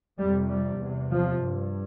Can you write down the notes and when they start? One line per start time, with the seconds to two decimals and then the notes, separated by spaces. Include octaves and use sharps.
0.18 F2 C3 G3
0.49 G3
0.80 E2 C3
1.10 F3
1.41 G2